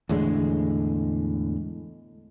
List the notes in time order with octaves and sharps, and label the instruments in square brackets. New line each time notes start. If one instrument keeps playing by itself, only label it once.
[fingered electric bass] E2 A2 D3 G#3